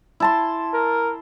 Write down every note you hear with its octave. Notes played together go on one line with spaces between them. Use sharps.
E4 A5 C6
A#4